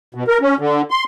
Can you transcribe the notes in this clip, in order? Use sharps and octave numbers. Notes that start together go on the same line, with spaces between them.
B2
A#4
C#4
D3
C6